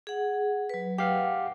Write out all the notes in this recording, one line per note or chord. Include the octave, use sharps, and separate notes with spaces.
G#4 F#5
F#3 B4
G4 F5 F#5